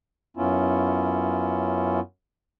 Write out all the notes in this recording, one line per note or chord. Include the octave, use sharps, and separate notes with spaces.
F#2 B3 C#4 E4 F4